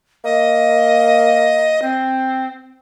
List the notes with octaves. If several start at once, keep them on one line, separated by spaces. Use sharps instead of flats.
A#3 D#5
C4